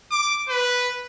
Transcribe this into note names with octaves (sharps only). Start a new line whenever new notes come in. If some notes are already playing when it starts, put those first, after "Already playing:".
D6
B4